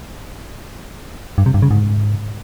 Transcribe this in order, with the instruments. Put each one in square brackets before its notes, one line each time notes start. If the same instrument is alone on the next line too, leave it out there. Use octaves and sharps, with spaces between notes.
[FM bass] G2
C3
G2
C#3
G#2